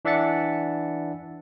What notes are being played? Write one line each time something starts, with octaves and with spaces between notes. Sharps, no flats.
E3 D4 E5 F#5 A6 C#7